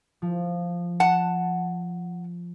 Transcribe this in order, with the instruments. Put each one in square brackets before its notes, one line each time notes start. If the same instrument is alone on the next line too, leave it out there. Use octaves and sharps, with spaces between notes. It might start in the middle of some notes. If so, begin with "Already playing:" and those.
[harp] F3
[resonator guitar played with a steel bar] F#5 A5